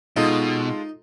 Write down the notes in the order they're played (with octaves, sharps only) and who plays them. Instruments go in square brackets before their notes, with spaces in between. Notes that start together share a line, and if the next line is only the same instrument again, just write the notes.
[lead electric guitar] B2 [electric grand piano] G#3 F4 A4 [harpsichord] D#4